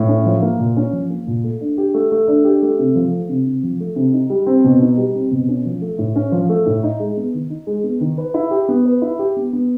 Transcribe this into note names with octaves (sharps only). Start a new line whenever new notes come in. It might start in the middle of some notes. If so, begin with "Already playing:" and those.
Already playing: A2
C#4
F3
A#3
A#2
C#4
F3
A#3
A#2
A3
D4
G4
A3
A3
D4
G4
A3
C3
F3
A3
C3
C3
F3
A3
C3
D#4
G3
C4
B2
D#4
G3
C4
B2
C#4
F3
A3
A2
C#4
F3
A3
A2
D#4
G#3
B3
D#3
D#4
G#3
B3
D#3
B4
E4
G4
B3
B4
E4
G4
B3
B3